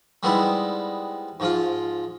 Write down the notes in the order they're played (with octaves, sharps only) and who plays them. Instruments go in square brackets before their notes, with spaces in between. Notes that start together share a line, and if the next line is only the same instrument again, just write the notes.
[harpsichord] G3 G#3 B3 C4 D#4 E4
G#2 F3 F4